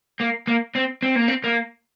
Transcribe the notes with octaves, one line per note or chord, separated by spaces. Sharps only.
A#3
A#3
C4
C4
A#3
C4
A#3